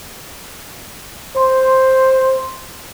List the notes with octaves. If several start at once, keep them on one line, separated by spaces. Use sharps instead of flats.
C5 C6